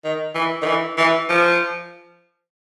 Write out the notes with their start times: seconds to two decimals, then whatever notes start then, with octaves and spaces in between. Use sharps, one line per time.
0.05 D#3
0.35 E3
0.62 D#3
0.66 E3
0.98 E3
1.30 F3